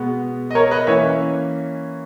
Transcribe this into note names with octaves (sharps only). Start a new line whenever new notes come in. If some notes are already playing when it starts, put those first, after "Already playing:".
Already playing: B2 G#3 B3
D#5
A#4 C#5
B4 D#5
E3 A#3 C#4 C#5 E5